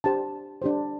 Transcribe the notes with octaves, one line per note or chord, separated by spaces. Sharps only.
D4 G4 C5 A5
D4 G4 C5